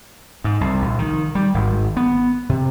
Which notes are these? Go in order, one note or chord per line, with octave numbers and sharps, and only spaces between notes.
G#2
C2
A#1
D#3
G3
G#1
B3
C3